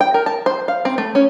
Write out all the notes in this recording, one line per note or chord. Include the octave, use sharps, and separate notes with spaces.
G5
A#4
A5
C5
F5
C4
A3
C#4